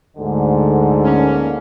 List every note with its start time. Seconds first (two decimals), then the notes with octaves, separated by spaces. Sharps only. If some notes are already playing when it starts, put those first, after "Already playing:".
0.17 D2 G#2 D3
1.05 A#3 C#4